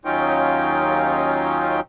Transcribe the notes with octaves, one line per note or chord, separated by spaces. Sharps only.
D#2 F#3 C#4 D#4 F4 G5